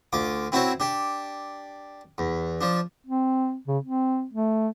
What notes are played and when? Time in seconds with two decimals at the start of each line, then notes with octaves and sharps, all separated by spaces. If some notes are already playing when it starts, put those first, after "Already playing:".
0.13 D2 F4 D6
0.52 C4 E4 F#4 C5 C#5
0.80 D4 G4
2.18 E2
2.61 F3 D4
3.07 C4
3.68 C#3
3.84 C4
4.33 A3